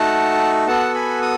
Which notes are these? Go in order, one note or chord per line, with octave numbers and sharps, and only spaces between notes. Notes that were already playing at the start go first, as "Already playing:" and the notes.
Already playing: A3 D#4 F#4 A4 F#5 A5
B3 F#4 A4 F#5 A5
G#5 B5
D#6